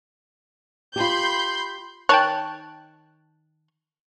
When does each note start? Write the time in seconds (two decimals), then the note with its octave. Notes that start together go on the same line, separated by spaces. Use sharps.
0.96 F4 G4 B5 C6 G6
2.09 D#3 C#5 G5 A5 F#6